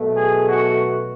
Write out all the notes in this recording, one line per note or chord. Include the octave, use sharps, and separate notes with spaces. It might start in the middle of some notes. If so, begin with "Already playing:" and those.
Already playing: B2 F#3 A3
G#4
F#4